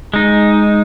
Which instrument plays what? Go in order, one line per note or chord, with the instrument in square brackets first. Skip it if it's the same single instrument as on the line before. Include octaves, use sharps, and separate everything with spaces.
[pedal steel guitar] G#3 D#4